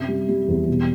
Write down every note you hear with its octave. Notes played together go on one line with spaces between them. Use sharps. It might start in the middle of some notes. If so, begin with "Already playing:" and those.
Already playing: F#2 C3 E5
G3
G3
E2
B2